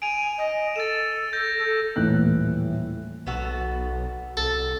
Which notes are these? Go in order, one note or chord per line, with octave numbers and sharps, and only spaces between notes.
G#5 D7 D#7 F7
D#5
A4 A6 E7
G6 A#6
A4
D#1 A2 E3 E4 F#6
B1 B3 F#4 A4
C2 A4